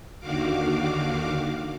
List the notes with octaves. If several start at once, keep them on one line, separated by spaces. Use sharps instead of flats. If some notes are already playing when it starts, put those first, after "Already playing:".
D#2 D3 D#3 F#4 F5 D6